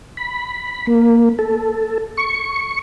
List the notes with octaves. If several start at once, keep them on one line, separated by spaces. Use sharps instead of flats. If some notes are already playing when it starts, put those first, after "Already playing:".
B5
A#3
A4
C#6